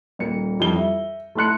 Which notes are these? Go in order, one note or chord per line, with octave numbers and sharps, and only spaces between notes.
D#1 A#3 C#7
F2 E3 G3 G7
E5
A3 E4 C6 F#6 C#7